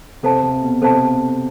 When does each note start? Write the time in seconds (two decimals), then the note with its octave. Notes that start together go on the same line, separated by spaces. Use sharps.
0.23 C3 A4 C5 F5 A5
0.43 C3
0.62 B2
0.82 C3 A4 C5 F5 A5